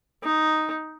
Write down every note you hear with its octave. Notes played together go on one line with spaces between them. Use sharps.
D#4